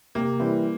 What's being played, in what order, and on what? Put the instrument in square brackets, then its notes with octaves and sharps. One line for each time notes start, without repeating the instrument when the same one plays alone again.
[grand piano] C3 [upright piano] A#3
[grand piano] E3 G3 C4 E4